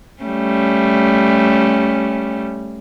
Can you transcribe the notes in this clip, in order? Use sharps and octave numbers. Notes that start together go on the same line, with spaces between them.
G3 A3 C#4